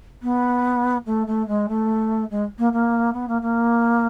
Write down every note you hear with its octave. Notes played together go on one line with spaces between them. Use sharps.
B3
A3
A3
G#3
A3
G#3
A#3
A#3
B3
A#3
A#3